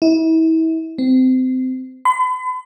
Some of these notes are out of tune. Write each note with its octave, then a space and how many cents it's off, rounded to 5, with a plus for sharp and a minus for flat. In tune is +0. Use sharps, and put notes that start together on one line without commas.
E4 -35
C4 -25
B5 +45